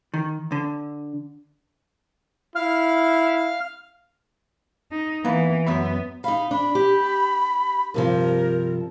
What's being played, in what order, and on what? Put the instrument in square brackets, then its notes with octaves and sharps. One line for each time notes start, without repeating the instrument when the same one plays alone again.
[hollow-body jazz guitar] D#3
D3
[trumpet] E4 [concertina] F5 F6
[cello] D#4
[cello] E3 [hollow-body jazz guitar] A#3 B3
[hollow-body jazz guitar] F#2 E5 B5 [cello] B3
[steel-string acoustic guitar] D#4 F5 [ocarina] B5
[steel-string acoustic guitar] D4 [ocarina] B5
[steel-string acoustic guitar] G4
[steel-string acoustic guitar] G2 C3 F3 [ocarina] A#4